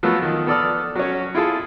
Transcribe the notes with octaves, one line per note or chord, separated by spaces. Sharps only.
F3 F#3 A3 B3 A4
D#3 F3
B3 A4 D5 D#6 F6
F#3 C#4
E4 F4 G#4 A4